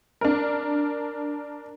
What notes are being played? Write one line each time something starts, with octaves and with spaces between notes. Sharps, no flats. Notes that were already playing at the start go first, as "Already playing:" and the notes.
D4 A#4